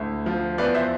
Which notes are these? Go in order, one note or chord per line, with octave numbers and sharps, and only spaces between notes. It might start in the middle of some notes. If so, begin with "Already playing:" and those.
Already playing: D2 A2
F3
E2 B4 D5
C5 E5